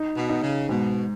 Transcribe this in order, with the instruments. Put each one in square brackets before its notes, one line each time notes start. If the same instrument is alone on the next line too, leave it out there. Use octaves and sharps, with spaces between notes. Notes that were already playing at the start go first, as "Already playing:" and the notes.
Already playing: [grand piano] D#4
[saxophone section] B2
[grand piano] D#4
[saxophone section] C#3
[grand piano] G#2 [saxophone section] B2